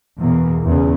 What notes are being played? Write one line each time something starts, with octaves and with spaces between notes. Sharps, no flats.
E2 B2 A#3
E2 C#3